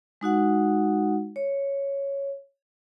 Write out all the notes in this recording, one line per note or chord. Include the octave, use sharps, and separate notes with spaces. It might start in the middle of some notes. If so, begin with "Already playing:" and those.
G#3 D#4 F#4 F#5
C#5